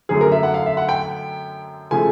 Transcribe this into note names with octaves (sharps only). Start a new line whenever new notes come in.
F#2 D3 F#3 A3 G#4
A#4
E5
F#5
F5
E5
F#5
G5
C#3 F3 A3 G#5